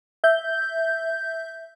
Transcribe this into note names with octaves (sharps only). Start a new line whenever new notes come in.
E5 G6